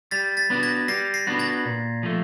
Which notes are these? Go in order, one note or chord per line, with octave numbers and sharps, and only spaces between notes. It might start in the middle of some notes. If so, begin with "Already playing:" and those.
G3 A6 B6
A6 B6
B3 D4 F#4 B4
G#6 A#6
G3 A#6 C7
A#6 C7
B3 D4 F#4 B4
G#6 A#6
A#2
F3 A3